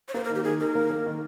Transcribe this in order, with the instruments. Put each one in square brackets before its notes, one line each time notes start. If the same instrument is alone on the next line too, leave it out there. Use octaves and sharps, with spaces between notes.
[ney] C#5
[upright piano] A#3 [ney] C5
[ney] A#4
[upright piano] D#3
[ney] G4
[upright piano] D#3 [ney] G#4
[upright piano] D#3 [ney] A#4
[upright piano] A#3
A#3
D#3